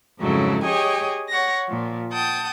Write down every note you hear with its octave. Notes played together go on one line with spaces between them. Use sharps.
F2 G#2 C#3 F#3 A3 E4
G4 G#4 C#5 D#5 G5 G#5
C#5 F#5 A#6
A#2 F3
F#5 G5 A5 D#6 G6